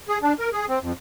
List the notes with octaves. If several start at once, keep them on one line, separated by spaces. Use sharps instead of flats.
G#4
D4
A#4
G#4
C4
F2